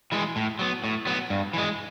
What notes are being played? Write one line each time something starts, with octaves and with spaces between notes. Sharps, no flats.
E3 G#3
A2
F#3 B3
A2
F#3 B3
G2
E3 G#3